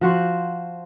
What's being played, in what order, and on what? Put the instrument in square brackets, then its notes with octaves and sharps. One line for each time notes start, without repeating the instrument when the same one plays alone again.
[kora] F3 F#4 C5